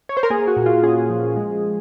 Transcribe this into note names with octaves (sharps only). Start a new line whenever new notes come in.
C#5
C5
A#4
A#3 G#4
F#4
A#2
F4
C#4 G#4
F3
G#3